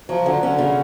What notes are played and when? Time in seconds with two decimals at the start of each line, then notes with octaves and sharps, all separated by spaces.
0.09 F3 F#3
0.26 D3 F#3
0.42 D3 C#4
0.59 C#3